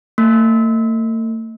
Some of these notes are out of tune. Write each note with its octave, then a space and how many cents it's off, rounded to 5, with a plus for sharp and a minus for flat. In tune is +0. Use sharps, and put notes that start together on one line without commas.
A3 +45